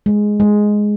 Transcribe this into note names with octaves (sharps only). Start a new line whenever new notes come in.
G#3
G#3